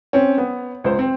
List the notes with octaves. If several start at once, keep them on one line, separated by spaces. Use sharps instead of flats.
C4 C#4
B3
C#2 C5
C4